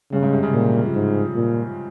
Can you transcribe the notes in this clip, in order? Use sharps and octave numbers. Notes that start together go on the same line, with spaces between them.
G2 C#3
G#2
C3
C#3
A#2 F3
G#2
A#2